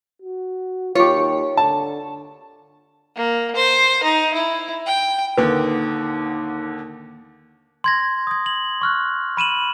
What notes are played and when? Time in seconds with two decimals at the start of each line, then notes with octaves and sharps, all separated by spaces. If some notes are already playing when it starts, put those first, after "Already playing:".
0.22 F#4
0.95 D#2 F4 G4 C#5
1.57 D3 A5
3.16 A#3
3.56 C5
4.03 D#4
4.34 E4
4.86 G5
5.38 D#2 D3 D#3 A#3 D#4 B4 F#5 D6
7.84 C6 G#6 A#6
8.27 D#6 G#6
8.46 F#7
8.82 C#6 F6 F#6
9.37 B5 D#7 E7 F#7